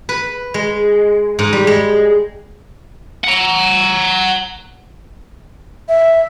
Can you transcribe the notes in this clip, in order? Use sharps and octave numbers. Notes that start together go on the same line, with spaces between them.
B4
G#3
G#2
G3
G#3
F#5 A#5
E5